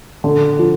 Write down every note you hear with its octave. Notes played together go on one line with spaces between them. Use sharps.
D3
F3